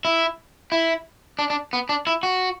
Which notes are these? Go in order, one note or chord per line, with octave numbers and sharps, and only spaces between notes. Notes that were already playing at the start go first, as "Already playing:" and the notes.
E4
E4
D4
D4
B3
D4
E4
F#4